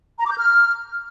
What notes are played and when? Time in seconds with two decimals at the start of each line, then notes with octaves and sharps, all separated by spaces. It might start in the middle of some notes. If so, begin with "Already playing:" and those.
0.19 A#5
0.25 D6
0.31 G6
0.38 F6